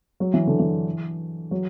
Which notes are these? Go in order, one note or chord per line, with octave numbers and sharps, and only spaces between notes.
F#3
E3
D3
E3
F#3